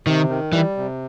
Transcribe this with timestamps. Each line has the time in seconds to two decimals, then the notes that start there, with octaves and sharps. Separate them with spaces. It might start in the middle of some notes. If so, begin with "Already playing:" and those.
0.07 C3 D#3
0.29 D#3
0.53 E3 G3
0.77 C3